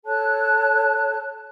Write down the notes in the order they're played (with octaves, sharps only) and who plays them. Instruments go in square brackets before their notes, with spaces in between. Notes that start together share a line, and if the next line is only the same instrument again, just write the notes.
[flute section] A4 C#5 A5 F#6